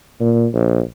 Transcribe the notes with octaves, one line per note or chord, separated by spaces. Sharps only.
A#2
A#1